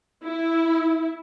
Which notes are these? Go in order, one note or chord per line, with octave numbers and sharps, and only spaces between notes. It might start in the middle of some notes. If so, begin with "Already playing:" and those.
E4